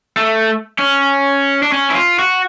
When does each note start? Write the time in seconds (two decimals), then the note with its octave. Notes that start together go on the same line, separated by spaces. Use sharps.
0.17 A3
0.79 C#4
1.62 D4
1.72 C#4
1.90 E4
1.95 F4
2.19 F#4